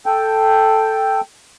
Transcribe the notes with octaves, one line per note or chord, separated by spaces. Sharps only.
A4 G5